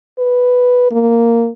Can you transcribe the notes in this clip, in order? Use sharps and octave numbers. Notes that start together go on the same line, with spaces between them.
B4
A#3